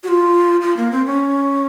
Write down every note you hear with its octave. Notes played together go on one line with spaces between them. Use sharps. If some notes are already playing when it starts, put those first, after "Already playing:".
F#4
F4
F4
A#3
C4
C#4